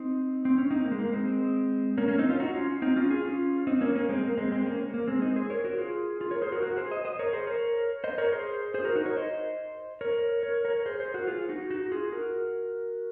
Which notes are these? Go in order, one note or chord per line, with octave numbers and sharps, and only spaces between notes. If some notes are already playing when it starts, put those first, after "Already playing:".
Already playing: C4 D#4
C4
C#4
C4 D#4
A#3
G#3
A#3
G#3 C4
A#3 C#4
A#3 C#4
C4 D#4
C#4 F4
D#4 F#4
C#4 F4
C4 D#4
C#4 F4
F4 G#4
C#4 F4
C4 D#4
A#3 C#4
A#3 C#4
G#3 C4
A#3
G#3 C4
G#3 C4
A#3 C#4
A#3
G#3 C4
C4 D#4
G#4 C5
A#4 C#5
F#4 A#4
F4 G#4
F4 G#4
A#4 C#5
G#4 C5
F#4 A#4
F#4 A#4
G#4 C5
C5 D#5
C5 D#5
A#4 C#5
G#4 C5
A#4 C#5
C5 D#5
A#4 C#5
G#4 C5
G#4 C5
F#4 A#4
D#4 F#4
A#4 C#5
C5 D#5
A#4 C#5
A#4 C#5
A#4 C#5
G#4 C5
G#4 C5
F#4 A#4
F4 G#4
D#4 F#4
D#4 F#4
F4 G#4
F#4 A#4